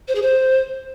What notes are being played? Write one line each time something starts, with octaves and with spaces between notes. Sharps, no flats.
C5
G#4
C5